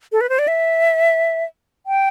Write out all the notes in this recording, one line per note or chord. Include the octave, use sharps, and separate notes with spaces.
A4
B4
C5
D5
E5
G5